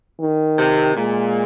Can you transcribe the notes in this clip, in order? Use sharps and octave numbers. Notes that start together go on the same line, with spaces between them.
D#3
C3
A#2 G#3